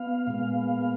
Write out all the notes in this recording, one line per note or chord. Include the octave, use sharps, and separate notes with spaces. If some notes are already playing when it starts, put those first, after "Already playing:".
Already playing: B3 F5
A#2 G#3 B3